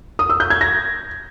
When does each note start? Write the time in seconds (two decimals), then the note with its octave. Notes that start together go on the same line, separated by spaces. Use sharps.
0.19 D#6
0.30 E6
0.40 G6
0.50 G#6
0.61 A#6